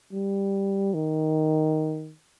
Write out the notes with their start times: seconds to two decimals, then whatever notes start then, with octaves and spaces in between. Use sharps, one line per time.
0.13 G3
0.94 D#3